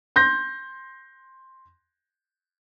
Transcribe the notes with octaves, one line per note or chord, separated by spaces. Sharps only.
C6 G6 A#6